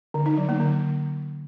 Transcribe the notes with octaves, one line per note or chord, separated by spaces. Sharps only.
D3
D#4
F#3
A#3
D3